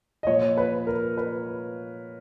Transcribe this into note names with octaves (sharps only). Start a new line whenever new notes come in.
D#5
A#2 F3 C#5
B4
A#4
B4